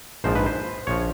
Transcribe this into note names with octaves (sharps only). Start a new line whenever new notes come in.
A#1 G#2 F3 C5
B4
C5
A#1 F3 C#5